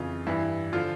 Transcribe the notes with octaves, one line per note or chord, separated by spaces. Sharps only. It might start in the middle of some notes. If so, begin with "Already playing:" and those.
Already playing: F2 C#3 E3 F4
G2 E3 E4
D3 F3 F4